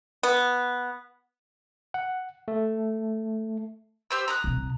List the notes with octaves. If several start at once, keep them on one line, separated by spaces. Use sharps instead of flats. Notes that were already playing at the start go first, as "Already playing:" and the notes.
B3
F#5
A3
G4 C5 E6
A#5 D#6 F#6
C2 C3